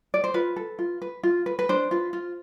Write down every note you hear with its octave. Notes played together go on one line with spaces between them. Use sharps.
D5
C5
F4 B4
A4
F4
B4
F4
B4
B4
D4 C5
F4 B4
F4